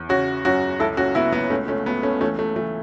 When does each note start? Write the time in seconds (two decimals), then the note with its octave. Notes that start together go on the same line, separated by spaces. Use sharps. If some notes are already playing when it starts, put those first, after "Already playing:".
Already playing: E2
0.09 C#3 C#4 F#4
0.45 F#2 C#4 F#4
0.80 C#2 E4 A4
0.97 C#4 F#4
1.15 C#2 B3 E4
1.33 B3 E4
1.50 C#2 A3 C#4
1.68 A3 C#4
1.86 C#2 B3
2.03 A3 C#4
2.21 E3 A3 C#4
2.39 A3
2.56 E3 A3